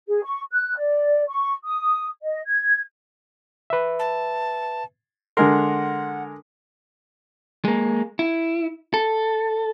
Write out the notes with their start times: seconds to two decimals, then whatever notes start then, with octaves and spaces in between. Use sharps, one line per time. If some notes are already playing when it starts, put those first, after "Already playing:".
0.07 G#4
0.23 C#6
0.50 F#6
0.75 D5
1.28 C#6
1.64 D#6
2.21 D#5
2.46 G#6
3.70 B4 E5
3.99 A5
5.37 D3 G#3 A#4 F#5 C6
7.65 G#3 A#3
8.19 E4
8.94 A4